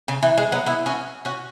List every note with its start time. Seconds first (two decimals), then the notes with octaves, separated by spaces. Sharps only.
0.08 C#3
0.23 E3
0.38 G#3
0.52 F#3 B3
0.66 B3 E4
0.86 C#4 F#4
1.25 C#4 F#4